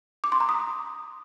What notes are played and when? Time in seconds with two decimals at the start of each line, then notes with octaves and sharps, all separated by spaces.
0.24 D6
0.32 C6
0.40 A#5
0.49 D#6